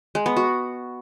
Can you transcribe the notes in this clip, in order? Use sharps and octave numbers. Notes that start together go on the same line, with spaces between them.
G#3
B3
F#4